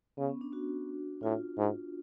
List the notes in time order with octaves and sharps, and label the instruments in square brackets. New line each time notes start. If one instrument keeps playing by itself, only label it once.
[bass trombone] C#3 [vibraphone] B3
[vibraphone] C#4
D4
D4 F#4
[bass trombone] A2 [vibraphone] F4
[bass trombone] G#2